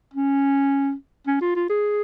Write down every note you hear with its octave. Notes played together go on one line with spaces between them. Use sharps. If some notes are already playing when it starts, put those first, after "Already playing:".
C#4
C#4
F4
F4
G#4